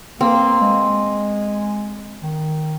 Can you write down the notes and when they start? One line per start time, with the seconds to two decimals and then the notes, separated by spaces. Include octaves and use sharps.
0.21 A#3 C4
0.61 G#3
2.23 D#3